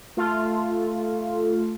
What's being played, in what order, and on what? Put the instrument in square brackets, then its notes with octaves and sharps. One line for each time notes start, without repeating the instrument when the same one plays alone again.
[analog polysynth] A3 F4